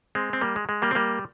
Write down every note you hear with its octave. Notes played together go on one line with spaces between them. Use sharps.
G#3 C4
C4
G3 A#3
G#3
G#3
G3 A#3
C4
G3 A#3